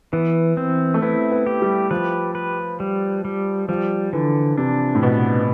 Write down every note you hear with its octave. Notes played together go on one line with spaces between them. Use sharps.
E3 B3
C4
A3
B3 E4
B3
G4
G3
F3 B4
B4
G3
G3
F3 G3
D3 E3
C3 D4
A2
B2 B3